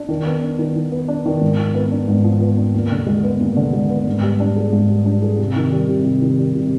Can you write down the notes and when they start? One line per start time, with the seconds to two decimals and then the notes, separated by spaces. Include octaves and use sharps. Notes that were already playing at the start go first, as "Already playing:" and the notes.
Already playing: D4
0.09 D#3
0.26 B3
0.42 D4
0.59 D#3
0.76 D#3
0.92 B3
1.08 D4
1.26 D#3
1.41 G#2
1.58 F3
1.75 B3
1.91 D4
2.08 G#2
2.24 F3
2.41 B3
2.57 D4
2.74 D#2
2.91 D3
3.07 G#3
3.23 B3
3.40 D#2
3.56 D3
3.73 G#3
3.90 B3
4.07 G#2
4.23 G3
4.40 D4
4.56 G#4
4.73 G#2
4.90 G3
5.05 D4
5.22 G#4
5.38 C3
5.56 D#3
5.72 G3
5.89 C3
6.05 C3
6.22 D#3
6.38 G3
6.55 C3